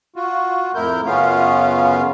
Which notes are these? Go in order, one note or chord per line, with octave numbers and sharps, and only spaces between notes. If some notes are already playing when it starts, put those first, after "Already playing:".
F4 F#4
F2 A2 E4 A#4 G6
F#2 C#3 B3 C#4 F4 F5